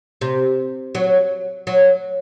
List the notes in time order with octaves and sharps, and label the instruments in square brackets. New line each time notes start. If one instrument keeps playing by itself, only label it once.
[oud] C3
F#3
F#3